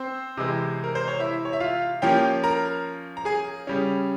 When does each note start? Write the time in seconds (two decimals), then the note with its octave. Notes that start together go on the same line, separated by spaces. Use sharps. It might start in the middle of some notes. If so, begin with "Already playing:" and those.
Already playing: C4 C5
0.37 C3 E3 G#3
0.84 A#4
0.95 C5
1.08 C#5
1.19 E4 E5
1.45 C#5
1.53 E5
1.60 F4 F5
2.02 F3 A#3 C#4 G4 G5
2.44 A#4 A#5
3.17 A#5
3.25 G#4 G#5
3.67 C#3 G3 C#4